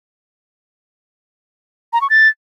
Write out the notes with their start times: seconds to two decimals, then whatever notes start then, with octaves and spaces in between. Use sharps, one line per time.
1.93 A#5
2.01 C#6
2.10 A6